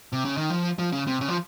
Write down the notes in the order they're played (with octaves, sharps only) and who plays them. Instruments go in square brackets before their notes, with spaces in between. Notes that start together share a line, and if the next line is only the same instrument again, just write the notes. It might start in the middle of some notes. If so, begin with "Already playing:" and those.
[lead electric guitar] C3
C#3
D#3
F3
F3
C#3
C3
C#3
F3